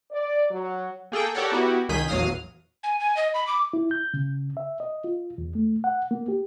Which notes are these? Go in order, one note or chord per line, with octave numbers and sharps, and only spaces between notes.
D5
F#3
A#3 G#4 A4 G5
G4 A4 A#4 C#5 D5 F#5
B3 E4 F#4 G4
C#2 D#3 G#4 G6 B6 D#7
A#1 E2 F#3 F5 D#6 F6
G#5
G#5
D#5
B5
D6
E4
G6
C#3
E5
D#5
F4
E2
A3
F#5
A#3
G4